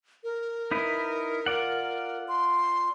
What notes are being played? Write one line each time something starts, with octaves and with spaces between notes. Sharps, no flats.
A#4
D#4 E4 B4
F4 D5 F#5
C6